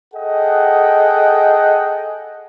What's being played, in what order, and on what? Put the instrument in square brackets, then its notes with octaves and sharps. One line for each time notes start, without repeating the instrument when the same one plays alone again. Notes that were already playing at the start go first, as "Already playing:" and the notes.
[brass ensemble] G#4 A4 D#5 F#5 G5